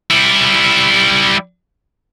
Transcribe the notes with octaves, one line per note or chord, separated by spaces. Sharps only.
G3 E4